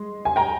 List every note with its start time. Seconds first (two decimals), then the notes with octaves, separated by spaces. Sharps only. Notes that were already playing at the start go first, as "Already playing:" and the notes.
Already playing: G#3 C6
0.25 G#5
0.36 G5 A#5